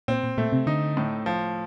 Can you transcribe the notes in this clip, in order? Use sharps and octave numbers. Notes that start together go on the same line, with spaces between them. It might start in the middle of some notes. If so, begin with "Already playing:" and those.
A#2 C4
A#2
A#2 A3
C3
D3 D#4
A2
F3